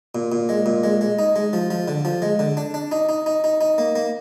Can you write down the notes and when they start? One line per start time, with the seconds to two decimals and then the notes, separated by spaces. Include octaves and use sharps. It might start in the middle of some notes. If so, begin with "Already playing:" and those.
0.15 A#2
0.32 A#2
0.49 G#3
0.66 A#2
0.84 G#3
1.01 G#3
1.19 D#4
1.36 G#3
1.53 F3
1.71 F3
1.88 D3
2.05 F3
2.22 G#3
2.39 D3
2.57 D4
2.74 D4
2.92 D#4
3.09 D#4
3.26 D#4
3.44 D#4
3.61 D#4
3.78 A#3
3.96 A#3